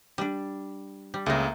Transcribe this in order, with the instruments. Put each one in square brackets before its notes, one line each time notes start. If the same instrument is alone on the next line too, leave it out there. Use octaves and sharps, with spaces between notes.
[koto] G3 D4
G3
[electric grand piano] C#2 C#3 [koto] A3 A#3